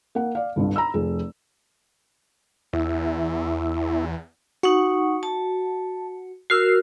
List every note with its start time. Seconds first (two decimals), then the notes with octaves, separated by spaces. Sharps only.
0.15 A#3 F#5
0.35 D5 F5
0.56 G1 C2 G2
0.76 A#5 B5 E6
0.94 F1 F3 G#4
2.73 E2 E4
4.63 D#4 F#4 F#5 C#6
5.23 A5
6.50 F#4 A#4 E6 F6 C7